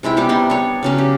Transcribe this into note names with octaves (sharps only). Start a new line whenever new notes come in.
C3 G#3 E4 G5
G3 B3 C#4 G4
C3 B3 D#4 C6
D4 C#5
C#3 F#3 C#4
G4